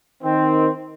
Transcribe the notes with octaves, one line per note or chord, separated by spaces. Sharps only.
D#3 C4